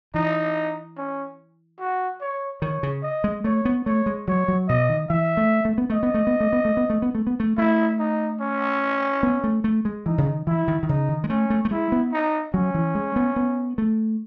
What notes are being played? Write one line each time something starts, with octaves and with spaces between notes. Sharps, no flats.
E3 D#4
C#4
F#4
C#5
D#3 C#5
C#3
D#5
G#3
A3 C#5
B3
A3 C#5
G#3
F#3 C#5
F#3
B2 D#5
D#3
E3 E5
A3
A3
B3
A3 D#5
B3
A3
B3
A3
B3
A3
B3
A3
B3
A3
B3
A3
A3 E4
D#4
C#4
B3
A3
A3
G#3
E3 D#4
C#3
D#3
E3 E4
D#3
D#3
C#3 D#4
D#3
G#3
A3 C#4
A3
A3
G#3 E4
B3
D#4
F#3 C#4
E3
G#3
B3
B3
A3